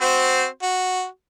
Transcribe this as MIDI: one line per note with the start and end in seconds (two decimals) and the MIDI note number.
0.01 0.46 60
0.01 0.46 66
0.01 0.46 72
0.63 1.06 66